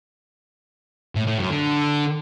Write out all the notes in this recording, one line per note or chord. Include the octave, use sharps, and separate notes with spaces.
A2
A2
F#2
D3